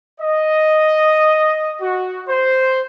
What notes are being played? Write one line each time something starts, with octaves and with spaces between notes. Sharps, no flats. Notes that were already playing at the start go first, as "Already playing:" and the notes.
D#5
F#4
C5